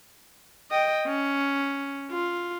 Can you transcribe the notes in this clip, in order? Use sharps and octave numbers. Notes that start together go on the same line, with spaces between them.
D#5 G5
C#4
F4